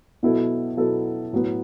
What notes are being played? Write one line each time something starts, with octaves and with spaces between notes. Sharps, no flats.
B2 F#3 B3 E4 A4
B2 F#3 B3 E4 A4
A2 F#3 B3